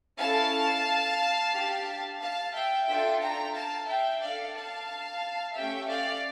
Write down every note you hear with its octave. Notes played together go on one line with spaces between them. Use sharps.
C#4 E4 A4 F5 A5
D4 G4
F5 A5
E5 G5
D4 F4 A4 E5 G5
G5 A#5
F5 A5
E5 G5
D4 A4 D5 F5
F5 A5
A3 C#4 G4 E5 G5
D5 F5